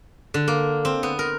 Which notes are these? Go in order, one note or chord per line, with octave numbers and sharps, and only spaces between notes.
D3
A#3
C4
B3
A#4